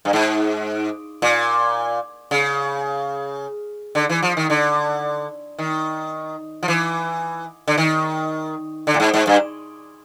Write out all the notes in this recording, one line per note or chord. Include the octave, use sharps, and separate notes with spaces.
G2
G#2
A#2
C#3
D3
E3
F3
D#3
D3
D#3
F3
E3
D3
D#3
D3
A2
G#2
G#2
G2